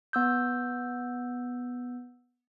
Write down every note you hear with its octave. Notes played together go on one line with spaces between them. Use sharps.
B3 E6 G6